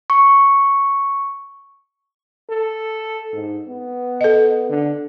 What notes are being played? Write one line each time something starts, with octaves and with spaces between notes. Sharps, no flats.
C#6
A4
G#2
B3
A4 D#5
D3